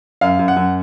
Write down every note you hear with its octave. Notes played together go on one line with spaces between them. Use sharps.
F#2 F5
F#2
F#5
F#2